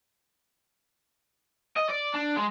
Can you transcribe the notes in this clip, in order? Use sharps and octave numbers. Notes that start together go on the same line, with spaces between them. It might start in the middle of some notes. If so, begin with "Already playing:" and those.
D#5
D5
D4
G#3